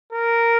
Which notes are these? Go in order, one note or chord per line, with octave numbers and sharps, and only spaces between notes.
A#4